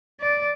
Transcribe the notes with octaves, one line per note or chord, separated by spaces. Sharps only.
D5